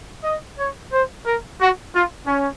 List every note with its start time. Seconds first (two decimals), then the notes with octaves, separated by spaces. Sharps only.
0.23 D#5
0.57 C#5
0.91 C5
1.25 A#4
1.58 F#4
1.93 F4
2.26 C#4